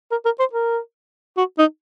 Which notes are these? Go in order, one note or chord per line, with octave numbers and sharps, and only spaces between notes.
A#4
A#4
C5
A#4
F#4
D#4